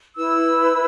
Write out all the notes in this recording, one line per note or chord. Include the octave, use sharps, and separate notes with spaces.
E4 B4 E6